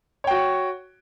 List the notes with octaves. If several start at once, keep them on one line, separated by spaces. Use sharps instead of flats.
F#4 C#5 G5